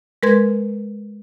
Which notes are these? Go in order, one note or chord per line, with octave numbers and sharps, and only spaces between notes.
G#3 A#4 B4 C6 G#6